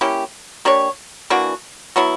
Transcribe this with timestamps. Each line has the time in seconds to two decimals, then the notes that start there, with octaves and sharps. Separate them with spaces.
0.01 A#3 C#4 E4 G4
0.65 A#3 D4 G4 C#5
1.30 E3 A#3 D4 F#4
1.96 F#3 B3 E4